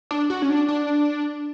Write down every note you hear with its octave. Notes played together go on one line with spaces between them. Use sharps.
D4
F#4
C#4
D4
D4